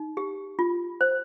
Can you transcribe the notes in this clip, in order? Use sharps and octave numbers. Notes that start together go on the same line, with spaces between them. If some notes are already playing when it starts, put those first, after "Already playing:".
Already playing: D#4
G4
F4
C5